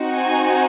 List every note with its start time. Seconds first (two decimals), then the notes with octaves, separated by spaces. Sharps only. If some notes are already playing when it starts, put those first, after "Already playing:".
Already playing: C4 D#4 F#4
0.15 G#5